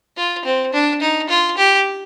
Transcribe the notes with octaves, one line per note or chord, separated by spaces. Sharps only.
F4
C4
D4
D#4
F4
G4